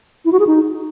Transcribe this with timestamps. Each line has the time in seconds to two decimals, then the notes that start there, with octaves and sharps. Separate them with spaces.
0.25 E4
0.32 F#4
0.39 G#4
0.47 D#4